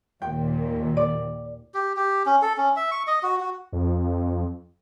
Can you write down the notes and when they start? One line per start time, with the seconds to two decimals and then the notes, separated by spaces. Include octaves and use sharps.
0.22 D#2 A#2 G5
0.97 D5
1.74 G4
1.97 G4
2.26 C#4
2.42 A4
2.57 C#4
2.76 E5
2.91 C#6
3.07 D#5
3.23 F#4
3.40 F#4
3.72 F2